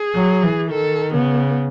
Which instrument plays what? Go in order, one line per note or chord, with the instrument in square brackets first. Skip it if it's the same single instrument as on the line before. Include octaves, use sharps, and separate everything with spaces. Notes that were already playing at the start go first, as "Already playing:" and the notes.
Already playing: [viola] G#4
[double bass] F#3
E3
[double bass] D#3 [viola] A4
[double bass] C#3 [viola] B3